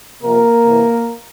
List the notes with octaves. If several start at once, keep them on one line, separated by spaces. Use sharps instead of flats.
C3 F3 A#3 A#4
C3 E3